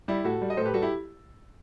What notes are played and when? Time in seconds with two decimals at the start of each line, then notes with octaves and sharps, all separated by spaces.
0.08 G3 E4 G4
0.24 A2 F#4 A4
0.42 G3
0.50 D#5
0.57 A2 A4 C5
0.65 G4 B4
0.74 G3 F#4 A4
0.82 E4 G4